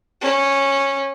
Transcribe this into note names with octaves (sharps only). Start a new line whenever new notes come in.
C#4